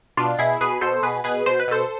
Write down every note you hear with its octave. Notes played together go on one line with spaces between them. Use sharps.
B2 D4 F4
B2 E4 G#4
B2 G#4 B4
B2 A4 C5
B2 G#4 B4
B2 G#4 B4
B2 C5
B4
B2 A4 C5